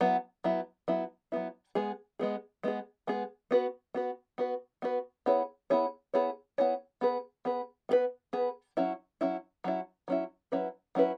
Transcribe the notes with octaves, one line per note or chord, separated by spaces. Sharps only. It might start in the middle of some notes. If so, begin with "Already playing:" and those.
F#3 B3 E4
F#3 B3 E4
F#3 B3 E4
F#3 B3 E4
G#3 B3 G#4
G#3 B3 G#4
G#3 B3 G#4
G#3 B3 G#4
B3 F#4 B4
B3 F#4 B4
B3 F#4 B4
B3 F#4 B4
B3 E4 G#4 C#5
B3 E4 G#4 C#5
B3 E4 G#4 C#5
B3 E4 G#4 C#5
B3 G#4 B4
B3 G#4 B4
B3 G#4 B4
B3 G#4 B4
F#3 C#4 E4
F#3 C#4 E4
F#3 C#4 E4
F#3 C#4 E4
F#3 C#4 E4 B4
F#3 C#4 E4 B4